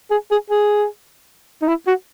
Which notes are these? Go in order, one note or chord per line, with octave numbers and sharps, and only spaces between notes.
G#4
G#4
G#4
D#4
E4
F#4